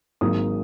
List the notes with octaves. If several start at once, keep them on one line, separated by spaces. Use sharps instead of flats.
G#1 G#2 F#3 A#3 D#6